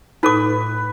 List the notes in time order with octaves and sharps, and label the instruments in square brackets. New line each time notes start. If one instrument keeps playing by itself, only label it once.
[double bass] A2 [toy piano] D#4 A4 D6 [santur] B4